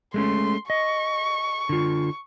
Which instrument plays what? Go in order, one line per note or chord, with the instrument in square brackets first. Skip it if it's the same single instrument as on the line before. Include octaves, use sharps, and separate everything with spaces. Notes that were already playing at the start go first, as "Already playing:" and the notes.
[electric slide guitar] G#3 A3 C#4 [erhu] C6
[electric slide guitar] D#5 [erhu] C#6
[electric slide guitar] D3 F4